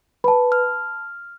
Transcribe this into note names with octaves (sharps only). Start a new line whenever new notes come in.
B4 A5 B5
F6